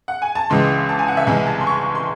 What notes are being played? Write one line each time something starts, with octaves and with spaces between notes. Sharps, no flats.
F#5
G#5
A5
C#2 C#3 E3 G#3 C6
A5
G#5
F#5
E5
C2 C3 E3 G#3 G#5
A5
C6
C#6
C6